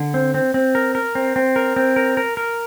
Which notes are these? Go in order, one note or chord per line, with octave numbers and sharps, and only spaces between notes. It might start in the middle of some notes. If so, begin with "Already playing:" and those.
Already playing: D3
C4
C4
C4
A#4
A#4
C4
C4
A#4
C4
A#4
A#4
A#4